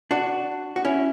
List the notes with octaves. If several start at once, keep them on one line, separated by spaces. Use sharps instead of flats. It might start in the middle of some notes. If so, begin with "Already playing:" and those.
D4 F#4
F#4
C#4 E4